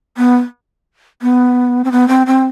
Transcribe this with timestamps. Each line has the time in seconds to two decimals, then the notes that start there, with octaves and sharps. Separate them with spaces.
0.17 B3
1.22 B3
1.85 C4
1.92 B3
2.08 C4
2.27 C4